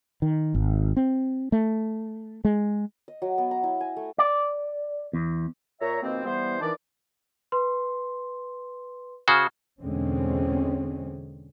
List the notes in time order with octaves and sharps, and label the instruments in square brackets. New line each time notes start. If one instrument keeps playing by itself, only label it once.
[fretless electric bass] D#3
G#1
C4
A3
G#3
[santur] D#5
F#3
B3
A#5
E4
G#5
A3
[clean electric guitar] D5
E2
[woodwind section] A#2 C#5 E5 A#5
F2 B2 D#3 A#3 C4
E3 G3 B3 C5
D#3 E3 D4 D5
[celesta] B4 C6
[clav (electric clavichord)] C#3 F#4 C5 [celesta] F6 G#6
[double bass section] E2 B2 D3 G#3 C4 C#4